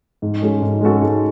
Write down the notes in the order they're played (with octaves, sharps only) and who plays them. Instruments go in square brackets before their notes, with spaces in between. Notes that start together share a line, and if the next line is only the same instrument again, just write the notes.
[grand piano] G#2
G#3 C#4 F#4 A4
G#2
G#3 C#4 F#4 A4
G#2